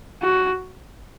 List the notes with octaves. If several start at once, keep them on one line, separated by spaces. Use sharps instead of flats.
F#4